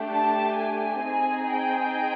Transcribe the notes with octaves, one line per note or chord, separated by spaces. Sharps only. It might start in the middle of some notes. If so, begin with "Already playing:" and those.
Already playing: A3 D4 G4
A5
G#5
C4 D#4 G#4
G5